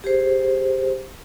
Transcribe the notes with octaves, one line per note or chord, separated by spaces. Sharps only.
G4 G#4 C5